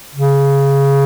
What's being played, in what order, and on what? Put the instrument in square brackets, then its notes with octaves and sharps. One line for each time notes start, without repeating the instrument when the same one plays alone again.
[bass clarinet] C#3